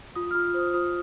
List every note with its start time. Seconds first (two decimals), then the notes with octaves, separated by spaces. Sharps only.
0.16 F4 D#6
0.31 F4 F6
0.54 C5 D#6
0.74 F4 D#6